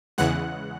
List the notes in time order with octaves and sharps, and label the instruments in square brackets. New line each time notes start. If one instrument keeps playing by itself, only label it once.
[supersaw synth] E2 C#3 E3 G#3 F#5 F#6